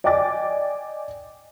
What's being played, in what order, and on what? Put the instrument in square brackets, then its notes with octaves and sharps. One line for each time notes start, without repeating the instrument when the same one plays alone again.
[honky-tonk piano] D5 D#5 G5 G#5 D6 A6